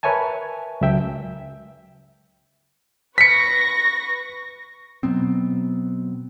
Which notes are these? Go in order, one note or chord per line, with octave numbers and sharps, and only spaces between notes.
A#4 B4 C#5 E5 G#5 A5
C#2 F#3 E5 G5
B4 C#6 A#6 B6 C#7
B2 F#3 B3 C4